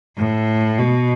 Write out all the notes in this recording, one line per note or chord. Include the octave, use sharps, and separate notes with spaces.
A2
B2